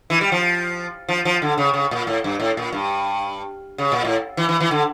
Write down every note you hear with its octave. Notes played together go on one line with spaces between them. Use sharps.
E3
G3
F3
F3
F3
D3
C#3
C#3
A#2
A2
G2
A2
A#2
G2
C#3
A#2
A2
E3
E3
E3
D3